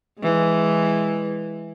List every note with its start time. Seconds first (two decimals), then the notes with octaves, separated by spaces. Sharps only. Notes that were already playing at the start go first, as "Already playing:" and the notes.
0.21 E3 G#3